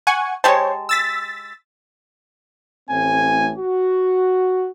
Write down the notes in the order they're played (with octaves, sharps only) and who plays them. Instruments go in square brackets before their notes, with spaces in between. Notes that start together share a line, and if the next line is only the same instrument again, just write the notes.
[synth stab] F#5 G#5 C#6
[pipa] G#3 G4 A5 [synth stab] C5 C#5
[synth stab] E6 A6 B6
[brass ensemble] A1 A2 C4 G#5
F#4